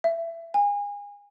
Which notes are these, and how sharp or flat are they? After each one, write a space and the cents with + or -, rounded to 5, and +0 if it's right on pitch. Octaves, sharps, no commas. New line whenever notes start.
E5 +20
G#5 -30